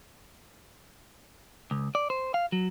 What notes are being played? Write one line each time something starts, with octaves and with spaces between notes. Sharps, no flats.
C#2
D5
C5
F5
F#3